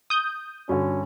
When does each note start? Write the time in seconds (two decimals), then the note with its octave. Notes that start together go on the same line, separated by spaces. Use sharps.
0.10 D#6 G6
0.69 G2 D3 C#4 F#4